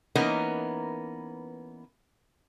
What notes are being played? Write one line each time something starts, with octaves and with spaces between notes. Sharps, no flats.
E3 A#3 B3 C#4 D#4 A#4